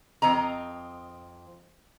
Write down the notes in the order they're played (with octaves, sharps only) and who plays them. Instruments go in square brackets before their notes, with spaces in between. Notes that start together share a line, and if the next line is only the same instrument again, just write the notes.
[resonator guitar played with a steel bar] F2 C4 D#5 A#5